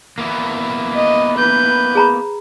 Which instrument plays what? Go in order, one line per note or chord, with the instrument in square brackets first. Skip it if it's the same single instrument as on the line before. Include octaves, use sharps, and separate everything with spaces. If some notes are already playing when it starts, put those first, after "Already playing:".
[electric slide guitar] A#3 B3 E4
[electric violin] D#5
B4 G6
[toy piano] G#4 A#5 B5